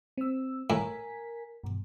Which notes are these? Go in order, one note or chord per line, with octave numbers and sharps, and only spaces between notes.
C4 E6
A2 A#4 G#5 B6
G2 B2